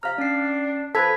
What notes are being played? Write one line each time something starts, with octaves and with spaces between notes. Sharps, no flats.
C3 F3 F5 A#5 F6
C#4 D4 C7
F3 A4 B4 B5 G#6 B6